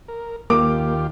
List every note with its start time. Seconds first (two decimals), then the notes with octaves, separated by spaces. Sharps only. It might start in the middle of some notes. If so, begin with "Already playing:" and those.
0.08 A#4
0.50 D#2 A#3 F4 G4 D6